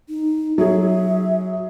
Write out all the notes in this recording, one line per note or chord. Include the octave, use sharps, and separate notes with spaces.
D#4
F#3 G#4 E5